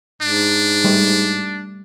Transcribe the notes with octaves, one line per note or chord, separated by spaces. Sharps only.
G#2 D4
G3 A3